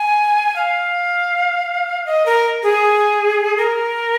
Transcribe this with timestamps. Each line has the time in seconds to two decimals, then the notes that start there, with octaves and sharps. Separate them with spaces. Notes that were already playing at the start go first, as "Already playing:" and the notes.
Already playing: G#5
0.56 F5
2.06 D#5
2.26 A#4
2.63 G#4
3.57 A#4